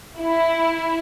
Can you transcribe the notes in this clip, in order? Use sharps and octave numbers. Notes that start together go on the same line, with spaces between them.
E4